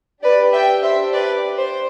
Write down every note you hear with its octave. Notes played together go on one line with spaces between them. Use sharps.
D4 G4 B4 D5
E5 G5
C5 E5
B4 D5
C5